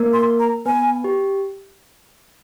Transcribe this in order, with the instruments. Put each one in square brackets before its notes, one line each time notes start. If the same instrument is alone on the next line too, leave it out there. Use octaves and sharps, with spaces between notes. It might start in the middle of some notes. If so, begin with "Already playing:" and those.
Already playing: [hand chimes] A#3 A#4
[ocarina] C6
A#5
[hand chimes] B3 B4 [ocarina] G#5
[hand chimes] G4